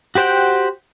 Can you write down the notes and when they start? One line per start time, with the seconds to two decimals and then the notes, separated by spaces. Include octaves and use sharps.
0.15 F#4 G4 C5 F#5 G5